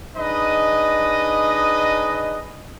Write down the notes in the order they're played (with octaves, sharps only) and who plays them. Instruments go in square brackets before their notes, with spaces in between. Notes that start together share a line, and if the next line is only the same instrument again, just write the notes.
[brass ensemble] D4 D#4 G#4 B4 D#5